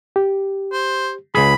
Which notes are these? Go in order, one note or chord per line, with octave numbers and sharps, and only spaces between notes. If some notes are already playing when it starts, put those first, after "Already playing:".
G4
C5
C#2 G#4 B5